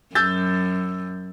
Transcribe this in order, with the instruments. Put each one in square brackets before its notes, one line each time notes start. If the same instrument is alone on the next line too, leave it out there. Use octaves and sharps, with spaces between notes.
[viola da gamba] F#2 [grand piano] E6 G6 A6